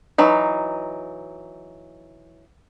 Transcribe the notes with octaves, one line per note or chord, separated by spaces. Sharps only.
E3 F#3 D#4